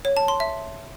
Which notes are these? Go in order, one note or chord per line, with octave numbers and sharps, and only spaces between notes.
C#5
A5
C6
E5